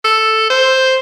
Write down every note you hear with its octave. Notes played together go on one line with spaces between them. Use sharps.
A4
C5